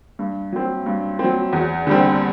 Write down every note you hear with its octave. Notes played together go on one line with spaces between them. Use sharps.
G2
F#3 C4
G2
C4
F#3
E2
D3 G3 C4